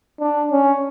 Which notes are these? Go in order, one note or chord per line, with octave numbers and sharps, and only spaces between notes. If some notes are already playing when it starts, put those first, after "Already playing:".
D4
C#4